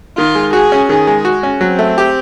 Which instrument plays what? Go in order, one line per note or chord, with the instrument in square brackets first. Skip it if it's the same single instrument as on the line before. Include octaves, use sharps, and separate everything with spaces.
[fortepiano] D#3 [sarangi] F4
[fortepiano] G#3
[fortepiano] F#4 [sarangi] G#4
[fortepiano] C#4
[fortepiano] D#3 [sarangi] G#4
[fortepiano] G#3
F#4
C#4
[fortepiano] F#3 [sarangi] C4
[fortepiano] A3
G4